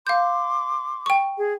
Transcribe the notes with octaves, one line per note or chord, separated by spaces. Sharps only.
F5 C6 D6 G6
G5 C#6
G#4